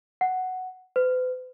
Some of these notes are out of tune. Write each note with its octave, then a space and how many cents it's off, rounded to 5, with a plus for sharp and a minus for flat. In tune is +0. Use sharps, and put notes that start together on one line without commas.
F#5 +5
B4 +45